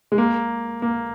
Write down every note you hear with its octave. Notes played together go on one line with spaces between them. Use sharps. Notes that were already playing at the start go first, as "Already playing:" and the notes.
G#3
A#3
A#3